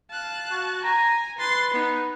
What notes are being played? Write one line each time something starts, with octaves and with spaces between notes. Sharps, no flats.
F5 A5 F#6
F#4
G#5 A#5
B4 C6 A6
B3 D#4